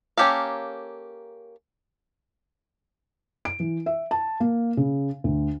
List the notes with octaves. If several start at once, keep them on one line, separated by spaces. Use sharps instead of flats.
A#3 C#4 G4 A4 F5
D7
E3
E5
A5
A#3
C#3
D2